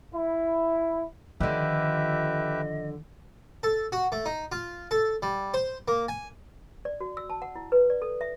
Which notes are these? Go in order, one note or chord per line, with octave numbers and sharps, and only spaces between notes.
E4
D3 D#3 F3 G4 B4 D#5 E5
A4
F#4
A3
D#4
F4
A4
G3
C5
A#3
G#5
D5
F#4
E6
A5
F#5
E4
B4
D5
A4
E5